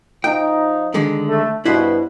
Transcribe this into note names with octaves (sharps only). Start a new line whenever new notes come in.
F3 D#4 G5
D3 D#3 G#3
A3
G2 B2 E4 B4 C5